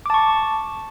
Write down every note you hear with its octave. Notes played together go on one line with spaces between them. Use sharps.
A5 C#6 D6